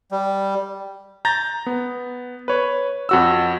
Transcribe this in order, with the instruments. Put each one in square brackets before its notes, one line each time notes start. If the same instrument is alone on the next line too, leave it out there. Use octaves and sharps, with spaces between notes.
[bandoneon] G3
[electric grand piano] A#5 G6 A6 A#6
B3
B4 C#5
F2 F#4 E6